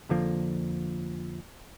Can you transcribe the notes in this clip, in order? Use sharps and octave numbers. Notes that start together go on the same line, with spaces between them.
F2 D3 F3 A#3